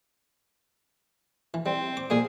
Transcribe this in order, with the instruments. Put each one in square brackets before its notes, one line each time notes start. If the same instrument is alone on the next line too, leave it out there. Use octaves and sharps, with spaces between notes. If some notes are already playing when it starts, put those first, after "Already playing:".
[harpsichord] E3
[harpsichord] G3 [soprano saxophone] C4
[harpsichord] D6
[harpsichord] A#2 G3 A#3 [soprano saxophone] G#4